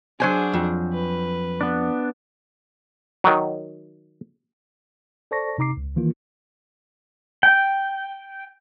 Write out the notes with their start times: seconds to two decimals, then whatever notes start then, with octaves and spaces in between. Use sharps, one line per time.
0.20 F#3 D4 G#4 C5 G#5
0.54 F2
0.93 B4
1.61 B3 D4
3.24 D#3 F#3
5.31 A4 C5 D5 A5 C#6 A#6
5.58 C3 D#4 A#5 D6 C7
5.77 C#2
5.96 D#3 E3 A#3 F4
7.43 G5